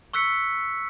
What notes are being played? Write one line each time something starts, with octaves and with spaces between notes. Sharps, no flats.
C#6 E6 F#6 B6 C#7